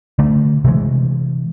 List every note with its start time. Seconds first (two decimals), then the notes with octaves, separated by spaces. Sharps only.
0.19 D3 A3
0.65 C3 E3 G#3